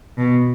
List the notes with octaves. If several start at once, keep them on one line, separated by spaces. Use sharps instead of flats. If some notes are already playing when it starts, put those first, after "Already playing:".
B2